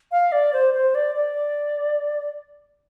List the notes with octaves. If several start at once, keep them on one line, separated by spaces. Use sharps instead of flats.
F5
D5
C5
C5
D5
D5